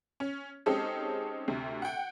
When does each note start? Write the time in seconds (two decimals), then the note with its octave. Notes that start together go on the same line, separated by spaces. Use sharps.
0.20 C#4
0.66 G#3 C4 C#4 D#4 G4 A4
1.48 D2 C3
1.82 F#5 G5